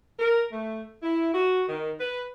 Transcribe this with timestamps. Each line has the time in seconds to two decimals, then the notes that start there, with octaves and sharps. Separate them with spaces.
0.19 A#4
0.52 A3
1.02 E4
1.34 F#4
1.69 D#3
1.99 B4